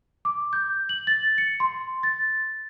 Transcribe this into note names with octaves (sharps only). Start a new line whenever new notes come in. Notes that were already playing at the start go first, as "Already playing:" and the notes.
D6
G6
F#7
A6
C#7
C6
A6